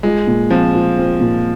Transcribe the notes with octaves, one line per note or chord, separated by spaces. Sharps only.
G#3 F4
A#2
F3 C4
F4
C4
A#2